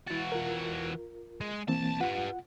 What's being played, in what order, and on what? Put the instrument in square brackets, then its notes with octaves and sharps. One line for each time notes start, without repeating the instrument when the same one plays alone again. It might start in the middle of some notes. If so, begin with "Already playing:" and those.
[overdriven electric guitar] E3 F#4 [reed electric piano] E4 A6
[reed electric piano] F4 A#4
[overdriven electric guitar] G#3
[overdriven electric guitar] B1 A5 [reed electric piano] E3 A#3 C4
[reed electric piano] F4 F#5 [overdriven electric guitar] G4 B4